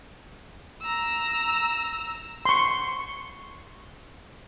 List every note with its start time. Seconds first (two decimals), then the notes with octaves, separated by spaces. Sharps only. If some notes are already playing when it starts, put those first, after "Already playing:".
0.82 A#5 E6
2.45 C6 C#6